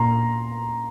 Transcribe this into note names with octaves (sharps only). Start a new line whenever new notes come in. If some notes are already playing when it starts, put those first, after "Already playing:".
Already playing: A#2 A#5 C6